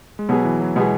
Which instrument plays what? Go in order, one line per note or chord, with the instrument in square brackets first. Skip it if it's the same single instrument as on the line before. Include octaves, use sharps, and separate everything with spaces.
[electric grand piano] G#3
[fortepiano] B2 B3 G#4 [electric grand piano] F#3
[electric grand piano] E3
F#3
[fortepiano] B2 B3 G#4 [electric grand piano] G#3